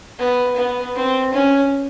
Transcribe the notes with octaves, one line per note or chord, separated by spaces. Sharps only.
B3
B3
C4
C#4